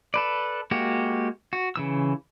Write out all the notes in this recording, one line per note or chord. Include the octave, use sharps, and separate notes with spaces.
A4 B4 D5
G#3 A#3 F#4 G4
F#4
C#3 E3 E6